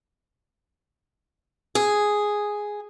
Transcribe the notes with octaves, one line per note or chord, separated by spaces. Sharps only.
G#4